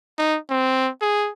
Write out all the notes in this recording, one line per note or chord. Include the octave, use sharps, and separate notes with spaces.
D#4
C4
G#4